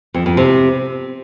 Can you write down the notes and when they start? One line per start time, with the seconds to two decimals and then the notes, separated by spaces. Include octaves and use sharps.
0.14 F2
0.26 F2
0.37 C3